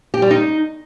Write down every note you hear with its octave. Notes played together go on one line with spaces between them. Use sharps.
G4
G3
D#4